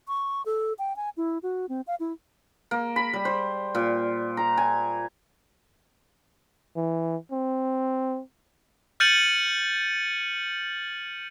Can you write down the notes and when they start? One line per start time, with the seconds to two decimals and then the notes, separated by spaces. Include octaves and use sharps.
0.08 C#6
0.46 A4
0.79 G5
0.96 G#5
1.17 E4
1.43 F#4
1.69 C4
1.87 F5
2.00 E4
2.71 A#3
2.96 B5
3.13 G3
3.25 C5
3.75 A#2
4.37 A#5
4.58 G#5
6.76 E3
7.32 C4
9.00 F6 G6 A6 C#7 D#7 F#7